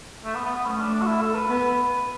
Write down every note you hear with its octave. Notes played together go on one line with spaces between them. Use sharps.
A3
B3
B3
B3
A3 C#4
D4
D4
F#4
E4
A4
B4
B3